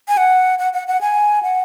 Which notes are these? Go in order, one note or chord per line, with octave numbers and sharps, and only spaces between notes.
G#5
F#5
F#5
F#5
F#5
G#5
F#5